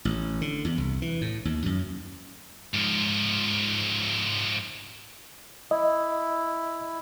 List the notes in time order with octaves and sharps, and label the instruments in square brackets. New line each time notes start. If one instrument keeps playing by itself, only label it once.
[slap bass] A1
D3
E2
C2
E3
A2
D#2
F#2
[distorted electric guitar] G#2 F3
[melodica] E4 [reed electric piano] D#5